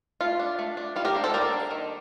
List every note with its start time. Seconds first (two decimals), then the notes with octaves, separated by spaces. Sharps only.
0.21 A3 F4
0.39 D4
0.59 A3
0.77 D4
0.96 G3 F4
1.05 G4 A#4
1.15 A#3 D4
1.24 A4 C5
1.34 G3 A#4 D5
1.52 A#3 D4
1.71 D#3